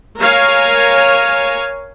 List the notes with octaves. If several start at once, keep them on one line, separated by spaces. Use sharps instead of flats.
A#4 C#5 F5 G#5